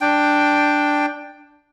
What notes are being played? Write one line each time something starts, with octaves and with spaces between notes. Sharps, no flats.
D4 G5